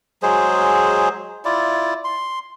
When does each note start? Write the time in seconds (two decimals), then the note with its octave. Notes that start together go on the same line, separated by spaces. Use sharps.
0.23 F#3 G#3 G#4 C5
1.45 E4 F4 D5
2.04 C6